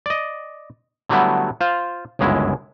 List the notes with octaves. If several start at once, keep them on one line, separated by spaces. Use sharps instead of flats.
D5 D#5
D3 F#3 G3 A3 B3 E4
F4 C5 F5
G1 C#2 F#2 G#3 E4